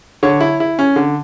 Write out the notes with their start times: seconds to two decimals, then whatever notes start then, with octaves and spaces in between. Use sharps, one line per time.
0.23 D3 C#5
0.41 E4
0.60 E4
0.79 C#4
0.96 D3